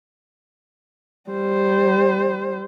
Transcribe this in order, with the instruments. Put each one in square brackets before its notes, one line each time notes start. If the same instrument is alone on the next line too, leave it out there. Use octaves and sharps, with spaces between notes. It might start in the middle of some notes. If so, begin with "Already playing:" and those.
[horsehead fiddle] G3 C5